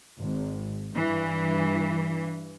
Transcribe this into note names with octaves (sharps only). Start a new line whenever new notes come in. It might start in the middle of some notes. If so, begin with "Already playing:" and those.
G#1
G2 E3